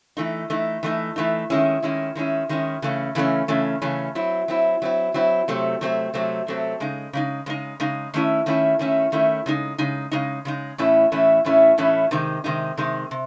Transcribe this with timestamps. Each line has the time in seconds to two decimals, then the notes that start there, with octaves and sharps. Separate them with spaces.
0.17 E3 A3 D#4
0.50 E3 A3 D#4
0.83 E3 A3 D#4
1.16 E3 A3 D#4
1.50 D#3 G#3 C#4 E4
1.83 D#3 G#3 C#4 E4
2.15 D#3 G#3 C#4 E4
2.49 D#3 G#3 C#4 E4
2.82 C#3 E3 A3 C#4
3.15 C#3 E3 A3 C#4
3.48 C#3 E3 A3 C#4
3.82 C#3 E3 A3 C#4
4.15 F#3 C4 E4
4.48 F#3 C4 E4
4.82 F#3 C4 E4
5.14 F#3 C4 E4
5.48 C3 F#3 A3 C4
5.81 C3 F#3 A3 C4
6.14 C3 F#3 A3 C4
6.47 C3 F#3 A3 C4
6.80 C#3 G#3 D#4
7.13 C#3 G#3 D#4
7.46 C#3 G#3 D#4
7.80 C#3 G#3 D#4
8.14 D#3 A3 C#4 E4
8.46 D#3 A3 C#4 E4
8.79 D#3 A3 C#4 E4
9.12 D#3 A3 C#4 E4
9.46 C#3 G#3 D#4
9.78 C#3 G#3 D#4
10.12 C#3 G#3 D#4
10.45 C#3 G#3 D#4
10.78 A2 E3 A3 C#4 E4
11.12 A2 E3 A3 C#4 E4
11.45 A2 E3 A3 C#4 E4
11.78 A2 E3 A3 C#4 E4
12.11 C3 D#3 G#3 D#4
12.44 C3 D#3 G#3 D#4
12.77 C3 D#3 G#3 D#4
13.11 C3